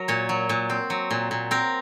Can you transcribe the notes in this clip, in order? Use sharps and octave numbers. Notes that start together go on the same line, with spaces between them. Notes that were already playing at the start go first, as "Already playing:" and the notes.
Already playing: F#3 A#4
A#2 C#5
F#3
A#2
C4
F#3
A#2
A#2
C4 A#4